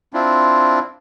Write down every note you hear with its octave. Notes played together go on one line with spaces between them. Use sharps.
C4 D4 E4 F4